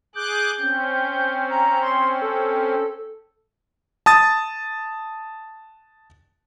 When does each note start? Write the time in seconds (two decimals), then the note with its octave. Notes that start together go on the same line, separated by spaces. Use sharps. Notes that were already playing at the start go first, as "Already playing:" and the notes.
0.15 G#4 D6 F#6 G6
0.60 C4 C#4
1.50 A#5
1.83 C6
2.22 A4
4.06 A5 D#6 A6